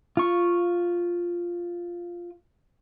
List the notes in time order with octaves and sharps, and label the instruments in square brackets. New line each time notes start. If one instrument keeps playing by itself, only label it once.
[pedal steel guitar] F4 C#6